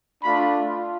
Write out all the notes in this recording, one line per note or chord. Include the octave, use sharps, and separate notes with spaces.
A3 D4 F4 B5
F4